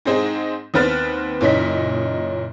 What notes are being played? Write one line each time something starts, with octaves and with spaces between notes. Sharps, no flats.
G#2 G#3 C4 D#4 G#4
D#2 B3 C4 B4 F6 A6
F#1 A#2 C#4 D#4 B6